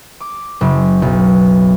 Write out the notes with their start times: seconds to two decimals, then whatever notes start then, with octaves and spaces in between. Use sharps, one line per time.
0.20 D6
0.61 F#1
1.02 B1